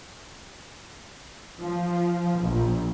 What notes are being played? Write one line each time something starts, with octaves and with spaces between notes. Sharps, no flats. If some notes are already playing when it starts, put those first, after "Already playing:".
F3
A#1